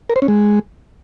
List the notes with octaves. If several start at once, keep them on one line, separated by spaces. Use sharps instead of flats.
A#4
C5
C#4
G#3